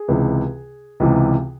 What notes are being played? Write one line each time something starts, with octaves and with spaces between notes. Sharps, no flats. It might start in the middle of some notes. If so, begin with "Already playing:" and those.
Already playing: G#4
C#2 C3 E3
C#2 C3 E3